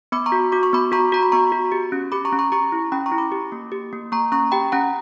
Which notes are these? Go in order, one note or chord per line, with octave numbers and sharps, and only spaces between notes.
B3 B5 D6
A#5 C#6
F#4
F#4 D6
C#6
B3 B5 D6
F#4 A#5 C#6
F#4 A#5
B5
B3 A#5 C#6
F#4
G4
C#4
G4 B5 D6
A#5 C#6
C#4
A#5 C#6
G4 A#5 C#6
E4
C#4 G5 B5
A#5 C#6
E4
B5 D6
G4
A#3
G4
A#3
A#3 A#5 C#6
C#4 A#5 C#6
G4 G5 B5
C#4 F#5 A#5